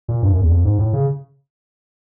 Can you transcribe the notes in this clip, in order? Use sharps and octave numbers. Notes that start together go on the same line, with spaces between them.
A#2
G2
F#2
E2
F2
G#2
A2
C#3